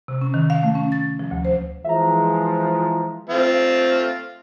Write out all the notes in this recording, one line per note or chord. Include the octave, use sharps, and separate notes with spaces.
C3
C#4
D#3
F5
A3
C#4
A6
F3
D2
C5
E3 F3 G#3 E5 A#5
A3 C4 F4